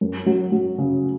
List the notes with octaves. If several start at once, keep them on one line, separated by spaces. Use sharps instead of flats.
F#2
F#3
F#3
C#3